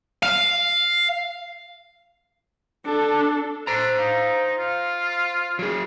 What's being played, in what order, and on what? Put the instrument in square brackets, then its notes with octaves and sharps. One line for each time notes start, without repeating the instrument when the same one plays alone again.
[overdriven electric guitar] F5
[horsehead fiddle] D4 A4
[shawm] D4 [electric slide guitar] C5 A#5
[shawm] D#4 [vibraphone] F5
[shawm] F4
[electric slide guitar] F#3 G#4